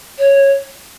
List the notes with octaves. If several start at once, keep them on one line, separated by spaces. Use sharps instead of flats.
C#5